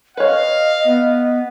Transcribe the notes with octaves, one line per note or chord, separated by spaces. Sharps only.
B4 C#5 D#5 F5
B3